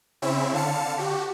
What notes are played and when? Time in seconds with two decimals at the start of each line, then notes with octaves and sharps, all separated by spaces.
0.22 C#3 C4 C#4 E4 E5
0.53 D3 F5 A5 C#7
0.98 F#4 G4